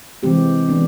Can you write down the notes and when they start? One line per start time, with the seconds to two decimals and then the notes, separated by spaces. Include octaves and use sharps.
0.23 C3 E3 G#3 C4 G4
0.69 E3 G#3 B3 D4